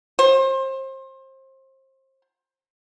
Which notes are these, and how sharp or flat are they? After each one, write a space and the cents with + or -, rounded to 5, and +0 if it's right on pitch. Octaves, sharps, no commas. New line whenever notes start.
C5 +30